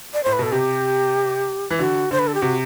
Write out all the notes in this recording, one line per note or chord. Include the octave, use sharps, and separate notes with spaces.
D5
A2 C5
B4
B2 A4
C3 G4
E3
D3 F#4
D3 C5
B4
A4
G4
C3 F#4